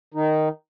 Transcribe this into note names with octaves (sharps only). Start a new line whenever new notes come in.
D#3 D#4